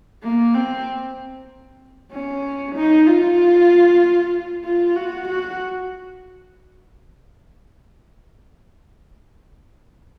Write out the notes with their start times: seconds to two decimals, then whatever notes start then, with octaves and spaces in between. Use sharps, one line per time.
0.23 A#3
0.54 C4
2.12 C#4
2.76 D#4
3.07 F4
4.65 F4
4.96 F#4
5.29 F#4